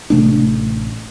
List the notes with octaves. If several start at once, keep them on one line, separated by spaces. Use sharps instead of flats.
A1 C3 A3 D4